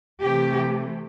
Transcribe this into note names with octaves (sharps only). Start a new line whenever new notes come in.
C3 E3 A3 G4